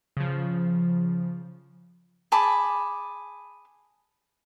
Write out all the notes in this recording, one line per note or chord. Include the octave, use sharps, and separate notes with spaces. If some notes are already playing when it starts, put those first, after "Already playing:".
C#3 F3
G#4 A5 B5 D6